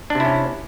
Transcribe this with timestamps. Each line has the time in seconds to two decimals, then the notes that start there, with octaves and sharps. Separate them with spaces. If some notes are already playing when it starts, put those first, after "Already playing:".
0.10 D4
0.15 C3
0.20 E4
0.25 C#4